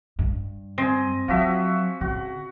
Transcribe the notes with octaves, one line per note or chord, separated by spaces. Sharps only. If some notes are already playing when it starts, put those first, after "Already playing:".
G2
C4 D#5 G#5
F3 F#3 F#4 E5
C#3 F#4